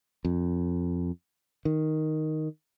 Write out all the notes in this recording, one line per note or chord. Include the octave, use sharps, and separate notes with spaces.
F2
D#3